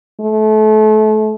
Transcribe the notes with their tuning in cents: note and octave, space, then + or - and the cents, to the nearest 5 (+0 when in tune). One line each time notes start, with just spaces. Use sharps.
A3 -30